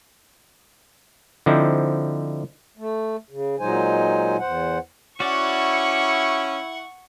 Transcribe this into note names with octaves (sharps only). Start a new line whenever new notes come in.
D3 F3 C4 D#4 E4
A3
C#3
A#2 F#3 G#3 D#4 C5 G#5
E2 C5 F#5
C#4 E4 F#4 D5 F#5 C#6